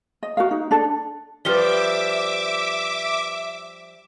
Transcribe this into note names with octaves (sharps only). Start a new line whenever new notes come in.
D#5
F#4 A#4 F5
D#4
D4 A4
F3 G3 B4 E5 D6 F6 G7